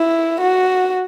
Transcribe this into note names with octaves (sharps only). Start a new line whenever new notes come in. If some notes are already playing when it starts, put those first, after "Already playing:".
Already playing: E4
F#4